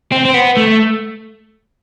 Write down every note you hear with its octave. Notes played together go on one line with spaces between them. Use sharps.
C4
C4
B3
A3